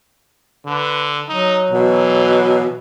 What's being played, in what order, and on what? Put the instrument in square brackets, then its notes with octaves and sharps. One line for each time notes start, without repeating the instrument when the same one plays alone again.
[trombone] D3 [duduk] B4
[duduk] F#3 [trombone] D#4
[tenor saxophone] B2 [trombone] E3